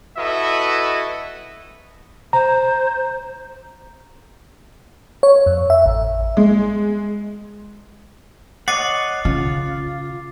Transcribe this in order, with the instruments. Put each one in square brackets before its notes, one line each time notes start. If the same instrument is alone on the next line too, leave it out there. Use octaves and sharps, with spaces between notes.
[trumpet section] E4 F#4 A4 B4 D#5 E5
[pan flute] C5 [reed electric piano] A#5
[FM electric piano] C#5
F2
E5
A1
[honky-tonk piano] G#3
[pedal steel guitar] C#5 D#5 F#5 [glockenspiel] D6 A6 C7
[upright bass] C#3 [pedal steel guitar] F4